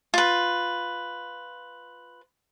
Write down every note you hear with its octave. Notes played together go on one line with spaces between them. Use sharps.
F4 B4